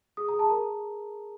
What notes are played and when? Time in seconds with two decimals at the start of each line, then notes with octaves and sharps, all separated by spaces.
0.17 G#4 D#6
0.28 A#5
0.33 G#4
0.39 A5
0.50 A#4 A#5